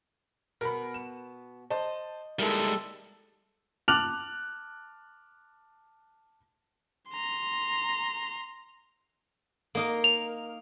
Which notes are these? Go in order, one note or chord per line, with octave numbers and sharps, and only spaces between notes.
B2 B3 A#4 B5
E7
C5 D#5 A5
G3 G#3 D#4 E4 A4 A#4 E5
A5 D6 F6 F#6 F7 F#7
A#5 C6
A#3 D#4 A#4
F7